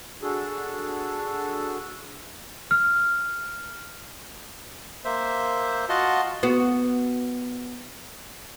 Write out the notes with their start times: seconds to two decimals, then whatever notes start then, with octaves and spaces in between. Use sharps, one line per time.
0.22 D4 F#4 G#4 A4
2.71 F6
5.05 A#3 C5 E5
5.89 F4 F#4 D#5 F#5 A5 C6
6.43 B3 F#4